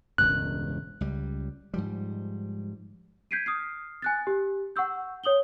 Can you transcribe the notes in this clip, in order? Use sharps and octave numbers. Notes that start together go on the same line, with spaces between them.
E1 C#2 G2 F#6
C#2 G3
G#2 F3 G3
G6 G#6 B6 C7 D7 D#7
D#6 F6 C7
G#5 F#6 A6
G4
F#5 C#6 E6 G6
C#5 D#6 F#7 G7